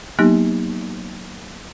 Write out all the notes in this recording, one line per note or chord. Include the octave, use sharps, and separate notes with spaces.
F#3 A#3 B3 D#4 G4